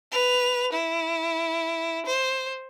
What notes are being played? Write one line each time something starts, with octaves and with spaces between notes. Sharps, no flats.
B4 F7
E4
C5